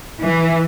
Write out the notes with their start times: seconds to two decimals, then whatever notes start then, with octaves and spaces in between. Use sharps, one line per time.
0.21 E3